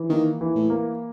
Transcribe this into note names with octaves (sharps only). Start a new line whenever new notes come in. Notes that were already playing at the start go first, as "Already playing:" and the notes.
Already playing: E3
D#3 A#3
E3
A2
A#3